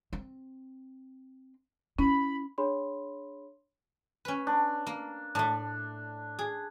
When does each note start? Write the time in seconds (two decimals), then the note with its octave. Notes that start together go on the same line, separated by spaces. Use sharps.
0.13 C4
1.99 C#4 E4 B5
2.58 D4 G#4 C#5 B5 C6
4.25 C#4 B4
4.47 D4
4.87 A#3
5.35 A2 A3 D4
6.39 G#4